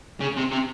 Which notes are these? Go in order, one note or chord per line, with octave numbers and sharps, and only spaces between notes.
C#3
C3
C3